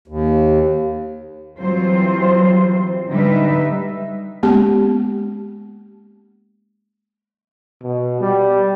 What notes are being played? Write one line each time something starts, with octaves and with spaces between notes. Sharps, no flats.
D#2
E3 F#3 G3 C4 F4 C5
D3 G3 D#4 B4 E5
G#3 A#3 B3 C#4 G4
B2
G3